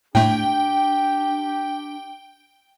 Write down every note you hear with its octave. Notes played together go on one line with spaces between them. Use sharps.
A2 A3 D4 G4 G5